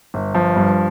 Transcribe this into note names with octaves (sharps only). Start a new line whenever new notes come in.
G1
F3
G2